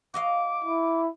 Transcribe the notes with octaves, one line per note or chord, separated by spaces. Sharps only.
F#4 D#5 F5 D6
E4